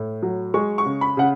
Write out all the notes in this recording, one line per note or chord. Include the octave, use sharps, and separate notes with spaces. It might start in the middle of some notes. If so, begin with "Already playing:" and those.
Already playing: A2
F#3
G#3 C#6
C#6
C#3
B5
C#3 F#5